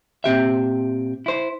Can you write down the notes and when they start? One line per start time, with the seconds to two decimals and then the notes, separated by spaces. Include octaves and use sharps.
0.24 A#2 C4 G4 E5
1.26 E4 C5